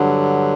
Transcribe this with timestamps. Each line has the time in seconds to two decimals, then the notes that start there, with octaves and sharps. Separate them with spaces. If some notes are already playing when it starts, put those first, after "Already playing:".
Already playing: G2 D3 F#3